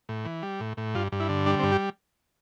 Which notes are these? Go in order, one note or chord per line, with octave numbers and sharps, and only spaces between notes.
A2
E3
G3
A2
A2
G2 F4
G2
E4
D3
G3 D4
C4
G2
G4